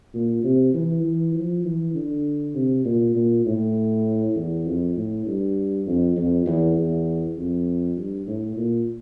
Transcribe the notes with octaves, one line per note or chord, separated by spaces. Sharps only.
A#2
C3
E3
E3
F3
E3
D3
C3
A#2
A#2
A2
E2
F2
A2
G2
F2
F2
E2
E2
F2
G2
A2
A#2